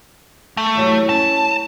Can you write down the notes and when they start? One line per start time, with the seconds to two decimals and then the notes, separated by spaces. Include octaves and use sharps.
0.57 A3
0.75 E2 F#3 G3
1.09 C#4 A5